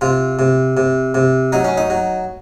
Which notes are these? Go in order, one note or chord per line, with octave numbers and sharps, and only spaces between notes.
C3 F4
C3
C3
C3
F#3 D#4
C#4
D#4
F#3